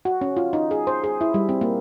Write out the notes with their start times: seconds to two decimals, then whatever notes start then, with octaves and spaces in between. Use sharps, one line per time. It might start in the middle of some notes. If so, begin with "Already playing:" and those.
0.05 F#4
0.21 C#4
0.37 F4
0.53 D#4
0.71 G#4
0.87 C5
1.04 G#4
1.21 E4
1.34 G3
1.49 C4
1.61 A#3